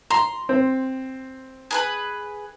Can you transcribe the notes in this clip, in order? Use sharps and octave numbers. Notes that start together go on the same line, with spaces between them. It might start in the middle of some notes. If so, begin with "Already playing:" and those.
A#5 C6
C4
G#4 A#4 B4